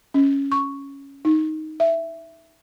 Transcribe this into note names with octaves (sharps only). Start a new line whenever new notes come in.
C#4
C#6
D#4
E5